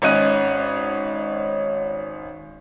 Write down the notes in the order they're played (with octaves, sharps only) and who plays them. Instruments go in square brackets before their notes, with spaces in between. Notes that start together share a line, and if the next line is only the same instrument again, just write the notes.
[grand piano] G#1 C#4 C#5 D#5 F#6 D#7